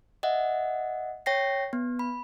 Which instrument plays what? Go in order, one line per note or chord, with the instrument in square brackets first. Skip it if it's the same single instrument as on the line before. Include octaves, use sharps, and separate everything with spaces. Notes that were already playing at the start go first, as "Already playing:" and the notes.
[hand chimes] D#5 E5 F#5
C#5 G5 A#6 C7
B3
B5